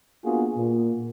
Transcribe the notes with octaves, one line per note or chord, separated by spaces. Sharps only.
A#3 B3 D4 F4 F#4 G#4
A#2